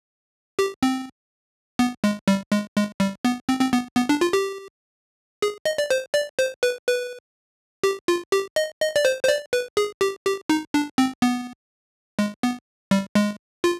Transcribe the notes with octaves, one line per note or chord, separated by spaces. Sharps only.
G4
C4
B3
G#3
G3
G#3
G#3
G3
B3
C4
C4
B3
B3
D4
F4
G4
G#4
D#5
D5
C5
D5
C5
B4
B4
G4
F4
G4
D#5
D#5
D5
C5
C5
D5
B4
G#4
G4
G4
D#4
D4
C4
B3
G#3
B3
G3
G#3
F4